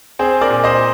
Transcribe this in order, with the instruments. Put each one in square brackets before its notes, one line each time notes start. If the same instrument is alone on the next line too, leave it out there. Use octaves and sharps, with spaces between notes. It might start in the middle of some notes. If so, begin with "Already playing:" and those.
[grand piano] C4 G#4 C5
A#4 D5
A#2
C5 D#5